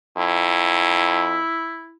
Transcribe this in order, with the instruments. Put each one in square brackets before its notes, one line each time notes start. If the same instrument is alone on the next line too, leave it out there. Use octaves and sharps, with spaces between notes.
[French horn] F2 [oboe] E4